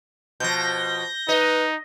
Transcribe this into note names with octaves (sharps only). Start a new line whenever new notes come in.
B2 F3 G6 A#6
D#4 B4 D#5